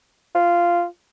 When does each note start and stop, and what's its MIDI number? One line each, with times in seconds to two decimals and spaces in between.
0.35 0.85 65